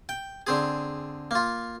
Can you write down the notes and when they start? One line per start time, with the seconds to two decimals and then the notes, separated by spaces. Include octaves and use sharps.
0.09 G5
0.47 D3 C4 G#4
1.31 A#3 F4